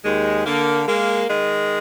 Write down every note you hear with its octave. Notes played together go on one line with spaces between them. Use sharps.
D#2 G#3
D3 A#3
G#3 A#3
D#3 G#3